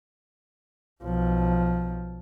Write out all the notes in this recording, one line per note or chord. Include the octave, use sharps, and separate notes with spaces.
B1 F3